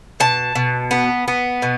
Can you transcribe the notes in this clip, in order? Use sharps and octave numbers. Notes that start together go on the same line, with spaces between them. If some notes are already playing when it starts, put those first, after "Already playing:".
B2 A5
B2
B3
B3
B2